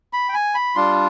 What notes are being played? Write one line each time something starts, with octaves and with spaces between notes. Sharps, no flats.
B5
G5
G#5
B5
G3 D4 F4 C6